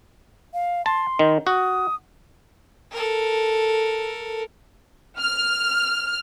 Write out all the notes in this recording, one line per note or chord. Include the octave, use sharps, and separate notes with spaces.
F5
A5 C6
D#3
F#4 D#6
A4 A#4
F6